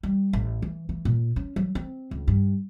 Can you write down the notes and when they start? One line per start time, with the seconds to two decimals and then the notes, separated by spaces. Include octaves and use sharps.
0.03 G3
0.33 A1
0.62 E3
0.89 E3
1.05 A#2
1.36 C#4
1.56 F#3
1.75 C4
2.11 C#2
2.27 G2